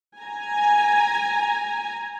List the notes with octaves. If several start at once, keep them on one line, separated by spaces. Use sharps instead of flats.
G#5 A#5